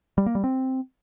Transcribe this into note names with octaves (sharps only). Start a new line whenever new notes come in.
G3
A#3
G3
C4